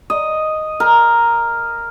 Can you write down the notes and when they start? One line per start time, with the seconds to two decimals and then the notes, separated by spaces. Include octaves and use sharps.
0.10 D#5
0.80 A#4